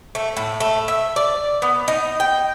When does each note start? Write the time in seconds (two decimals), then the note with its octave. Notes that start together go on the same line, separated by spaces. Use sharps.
0.15 A3
0.37 A2
0.60 A3
0.88 E5
1.16 D5
1.62 B3
1.88 D#4
2.20 G5